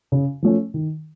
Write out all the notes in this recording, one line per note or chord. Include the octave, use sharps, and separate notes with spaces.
C#3
F3 A3 C#4
D#3